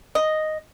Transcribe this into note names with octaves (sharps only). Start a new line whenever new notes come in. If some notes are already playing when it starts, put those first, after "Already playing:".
D#5